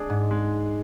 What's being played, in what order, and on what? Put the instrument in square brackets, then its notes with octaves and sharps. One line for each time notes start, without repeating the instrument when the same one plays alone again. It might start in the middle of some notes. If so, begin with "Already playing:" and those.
Already playing: [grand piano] G#3 D4 G#4
[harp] G#2
[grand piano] G#3